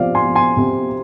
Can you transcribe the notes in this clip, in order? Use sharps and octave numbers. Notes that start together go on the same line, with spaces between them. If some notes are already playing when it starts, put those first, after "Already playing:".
Already playing: C3 F3 D5 F5
G#5 C6
F3
G#5 C6
C3